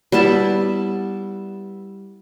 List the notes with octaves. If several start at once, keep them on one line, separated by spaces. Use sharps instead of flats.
G3 B3 E4 A5